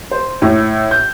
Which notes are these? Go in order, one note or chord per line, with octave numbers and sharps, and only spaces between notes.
C5
A2
G6